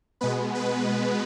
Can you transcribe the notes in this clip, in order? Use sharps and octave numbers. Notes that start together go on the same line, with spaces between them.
B2 G#3 B3 B4
B4